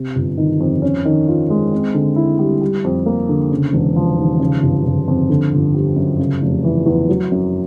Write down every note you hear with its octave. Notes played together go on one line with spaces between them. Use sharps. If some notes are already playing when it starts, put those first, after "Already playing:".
Already playing: C3
G1
D#3
F2
C#4
D#3
F4
G#3
C4
D3
E4
G3
G3
F2
A#3
D3
C#3
E1
F3
D#2
C#3
G1
G1
F2
D3
G1
G3
F#2
C#3
F1
E3
E2
F#3
F#2